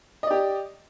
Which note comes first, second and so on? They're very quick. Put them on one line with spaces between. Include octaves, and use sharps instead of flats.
D#5 D5 G4